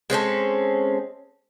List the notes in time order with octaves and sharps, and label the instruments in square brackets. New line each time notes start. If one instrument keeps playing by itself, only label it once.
[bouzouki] G#3 C4 C#4 A4